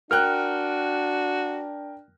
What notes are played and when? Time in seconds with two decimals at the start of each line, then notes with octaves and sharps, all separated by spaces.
0.11 D4 F#4 A#4 G5 F6 F#6